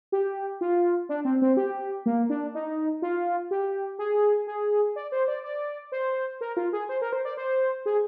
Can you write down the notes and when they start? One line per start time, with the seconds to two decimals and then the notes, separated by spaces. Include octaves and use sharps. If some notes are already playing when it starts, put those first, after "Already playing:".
0.12 G4
0.61 F4
1.09 D4
1.25 C4
1.42 C4
1.57 G4
2.06 A#3
2.30 D4
2.55 D#4
3.02 F4
3.51 G4
3.99 G#4
4.47 G#4
4.96 D5
5.12 C5
5.28 D5
5.44 D5
5.92 C5
6.41 A#4
6.57 F4
6.73 G#4
6.89 C5
7.02 A#4
7.13 C5
7.25 D5
7.37 C5
7.86 G#4